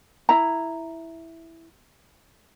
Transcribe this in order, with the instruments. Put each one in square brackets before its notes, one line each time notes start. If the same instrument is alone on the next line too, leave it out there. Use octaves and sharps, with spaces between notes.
[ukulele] E4 A#5